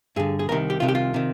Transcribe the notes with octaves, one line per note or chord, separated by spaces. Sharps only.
G2 D3 G#4
G#4
C2 C3 D#3 A#4
G4
C2 C3 D#3 F4
G4
F4
C3 D#3